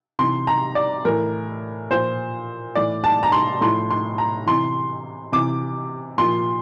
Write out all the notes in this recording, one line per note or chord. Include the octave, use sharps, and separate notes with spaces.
C3 E3 C6
A#5
D5
A2 E3 A#4
A#2 F3 C5
A2 E3 D5
A5
A#5
C6
A2 F3 C6
C6
A#5
C3 E3 C6
C3 E3 D6
A#2 F3 C6